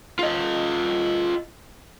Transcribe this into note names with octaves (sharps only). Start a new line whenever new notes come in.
F4 D#5